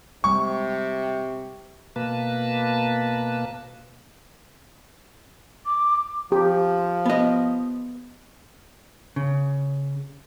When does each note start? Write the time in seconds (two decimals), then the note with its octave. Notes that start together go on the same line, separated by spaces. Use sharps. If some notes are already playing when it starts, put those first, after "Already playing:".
0.24 C3 G3 G#3 C#6
1.96 B2 A#3 B4 A5
5.66 D6
6.32 F3 G4
7.05 B3 D#5
9.16 C#3